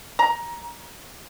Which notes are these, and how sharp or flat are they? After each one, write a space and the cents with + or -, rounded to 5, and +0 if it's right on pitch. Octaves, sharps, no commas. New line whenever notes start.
A#5 +20